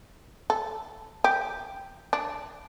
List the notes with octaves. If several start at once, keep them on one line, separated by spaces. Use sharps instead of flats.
A4
G4
D4